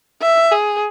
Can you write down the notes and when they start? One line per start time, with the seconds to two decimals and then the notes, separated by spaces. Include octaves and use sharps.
0.22 E5
0.52 G#4